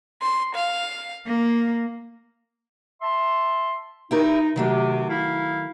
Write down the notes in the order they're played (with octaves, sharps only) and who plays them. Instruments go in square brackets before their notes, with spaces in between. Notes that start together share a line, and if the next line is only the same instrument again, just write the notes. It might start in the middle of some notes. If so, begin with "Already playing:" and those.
[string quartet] C6
F5
A#3
[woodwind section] E5 A5 C6
[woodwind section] D#4 [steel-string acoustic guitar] E4 G4 A#4
[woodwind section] C3 [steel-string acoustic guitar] D#3 F#3 A3
[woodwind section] E4 F5